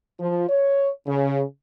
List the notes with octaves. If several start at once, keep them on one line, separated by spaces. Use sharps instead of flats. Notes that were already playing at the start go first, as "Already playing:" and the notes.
F3
C#5
C#3